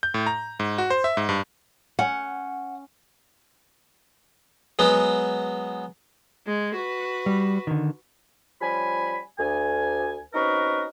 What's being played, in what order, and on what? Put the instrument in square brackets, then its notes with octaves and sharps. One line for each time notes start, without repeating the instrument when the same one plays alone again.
[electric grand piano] G6
A2
A#5
G#2
F#4
C5
E5
G#2
G2
[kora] C#4 [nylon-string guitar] F#5
[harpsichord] F#3 G#3 B3
[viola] G#3
F#4 B4
[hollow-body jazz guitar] G3
D3 D#3
[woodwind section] F3 G3 C#4 G#5 B5
D2 G#5
C4 C#4 D#4 F#4 A#4 B4